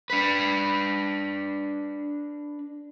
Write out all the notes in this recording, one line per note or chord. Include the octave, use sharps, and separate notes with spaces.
D4 B4